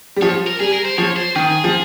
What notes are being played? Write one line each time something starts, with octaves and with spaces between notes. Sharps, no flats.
G3
F3 C#5
A#4
G3 G#4
A#4
C5
F3 C#5
C5
D#3 G#4
F3